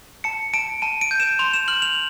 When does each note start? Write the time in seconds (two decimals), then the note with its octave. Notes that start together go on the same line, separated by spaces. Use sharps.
0.24 A5 C#7
0.54 A5 D7
0.82 A5 D#7
1.01 D7
1.11 G6
1.20 E7
1.39 C6 F7
1.53 E7
1.68 F6 F#7
1.82 F7